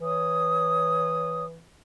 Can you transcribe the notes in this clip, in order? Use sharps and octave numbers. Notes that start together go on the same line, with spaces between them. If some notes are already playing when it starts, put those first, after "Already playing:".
E3 C#5 D#6